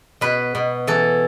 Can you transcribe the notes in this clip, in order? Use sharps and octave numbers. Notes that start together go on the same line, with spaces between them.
B2 B4
B2
E3 A4